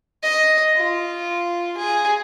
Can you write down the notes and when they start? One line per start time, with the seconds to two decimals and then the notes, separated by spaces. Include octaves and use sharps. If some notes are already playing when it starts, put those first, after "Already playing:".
0.23 D#5
0.77 F4
1.77 G#4